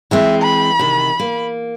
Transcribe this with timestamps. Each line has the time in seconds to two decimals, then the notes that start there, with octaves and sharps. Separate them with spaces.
0.11 E3 G#3 C4 E5
0.42 B5
0.79 C3 D#3
1.19 A#3